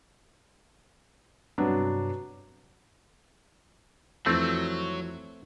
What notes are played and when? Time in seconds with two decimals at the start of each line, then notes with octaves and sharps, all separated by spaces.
1.58 G2 C3 F#3 B3 D4
4.26 F2 E3 F#3 A3 C4